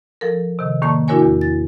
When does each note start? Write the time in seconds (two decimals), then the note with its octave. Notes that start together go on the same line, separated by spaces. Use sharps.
0.21 F3 A4 A#4
0.59 C3 D#3
0.82 A2 D#3 A#3 D5 A5 C#6
1.08 D4 E4 F#4 A#4 C#5 G#5
1.22 E2
1.41 A6